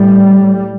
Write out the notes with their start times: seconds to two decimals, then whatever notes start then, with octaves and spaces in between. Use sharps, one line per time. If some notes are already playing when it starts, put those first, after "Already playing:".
Already playing: A2 G3